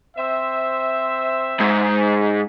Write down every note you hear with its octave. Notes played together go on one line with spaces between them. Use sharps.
C4 C5 E5
G#2